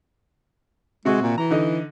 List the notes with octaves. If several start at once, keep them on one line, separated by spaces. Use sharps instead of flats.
C3 G#3 F#4
A#2
E3 A#5
D3 D#4